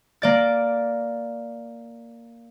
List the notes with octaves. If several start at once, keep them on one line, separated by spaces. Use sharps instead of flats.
A#3 D5 A6